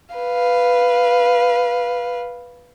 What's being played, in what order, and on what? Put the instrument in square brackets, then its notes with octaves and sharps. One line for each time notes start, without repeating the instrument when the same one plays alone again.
[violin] B4 F5